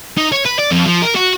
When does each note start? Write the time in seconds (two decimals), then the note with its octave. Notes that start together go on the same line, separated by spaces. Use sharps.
0.17 D#4
0.32 C#5
0.46 B4
0.59 D5
0.71 F2
0.86 F3
1.03 A#4
1.16 F#4